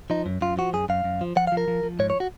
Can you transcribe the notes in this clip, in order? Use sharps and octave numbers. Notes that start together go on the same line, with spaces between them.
F3 D#4
F#2
F#2 F4
F3 F#4
F#2 G#4
F#2 F5
F#2
F3
F3 F#5
F5
F3
A#4
F3
F3
G#2 C#5
C#5
F#4